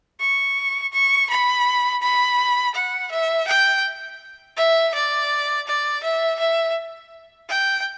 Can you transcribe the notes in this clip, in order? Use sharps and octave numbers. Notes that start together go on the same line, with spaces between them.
C#6
C#6
B5
B5
F#5
E5
G5
E5
D5
D5
E5
E5
G5